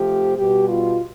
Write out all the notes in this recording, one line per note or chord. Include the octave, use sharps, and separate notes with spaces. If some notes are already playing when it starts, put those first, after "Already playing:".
Already playing: C3 F3 A3 G4
B2 G3 G4
F4